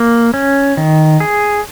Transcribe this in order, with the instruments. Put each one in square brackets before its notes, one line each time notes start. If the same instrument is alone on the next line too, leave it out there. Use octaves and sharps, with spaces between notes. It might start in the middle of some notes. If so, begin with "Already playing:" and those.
Already playing: [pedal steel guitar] A#3
C#4
D#3
G#4